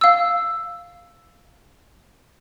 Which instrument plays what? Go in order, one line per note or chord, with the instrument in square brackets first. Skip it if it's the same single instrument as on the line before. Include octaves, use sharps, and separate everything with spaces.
[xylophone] F5 E6